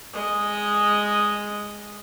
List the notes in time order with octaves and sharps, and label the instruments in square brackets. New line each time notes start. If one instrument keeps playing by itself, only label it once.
[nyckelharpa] G#3 D#5